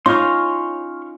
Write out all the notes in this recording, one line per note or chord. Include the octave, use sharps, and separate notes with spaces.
C#4 D#4 F4 C6 C#6 F6